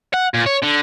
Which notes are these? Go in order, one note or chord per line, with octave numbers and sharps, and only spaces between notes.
F#5
A#2
C#5
D3